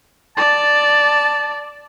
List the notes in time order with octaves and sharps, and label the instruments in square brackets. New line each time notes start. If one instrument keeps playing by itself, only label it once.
[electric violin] D5 [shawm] A5